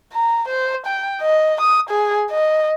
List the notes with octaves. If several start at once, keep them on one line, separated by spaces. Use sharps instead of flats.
A#5
C5
G5
D#5
D#6
G#4
D#5